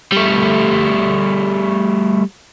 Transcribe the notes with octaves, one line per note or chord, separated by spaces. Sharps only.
G3 A3